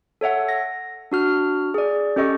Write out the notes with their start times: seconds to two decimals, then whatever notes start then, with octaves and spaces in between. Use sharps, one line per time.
0.21 A4 C#5 E5 F#5
0.49 A#6
1.12 D4 F#4 F6
1.74 G#4 D5
2.16 C#4 G4 A4 D#5 C#6